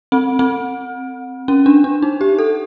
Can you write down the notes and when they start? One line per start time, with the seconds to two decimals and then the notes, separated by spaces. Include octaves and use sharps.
0.12 C4
0.39 C4
1.48 C#4
1.66 D4
1.84 D4
2.02 D#4
2.21 G4
2.39 A4